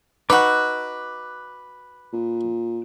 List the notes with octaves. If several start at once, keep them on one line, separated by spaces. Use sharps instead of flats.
D#4 F#4 B4 D6 E6 F#6
A#2